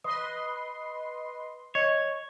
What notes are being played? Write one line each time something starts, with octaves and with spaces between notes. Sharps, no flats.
B4 D#5 C6 D#6
C#5 D#5